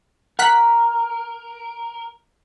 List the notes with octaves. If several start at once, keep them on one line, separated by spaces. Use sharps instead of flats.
A#4 F#5 F#6 B6